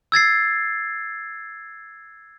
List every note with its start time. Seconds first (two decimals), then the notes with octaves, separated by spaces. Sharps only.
0.12 E6 G#6 A6 C7